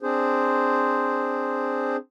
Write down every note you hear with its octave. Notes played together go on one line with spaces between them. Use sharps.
C4 D4 G#4 C5